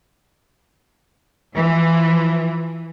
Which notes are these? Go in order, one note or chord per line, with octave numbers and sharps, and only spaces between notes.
E3 F3